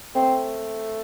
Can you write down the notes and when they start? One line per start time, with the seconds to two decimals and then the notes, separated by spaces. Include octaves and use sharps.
0.15 A3 C4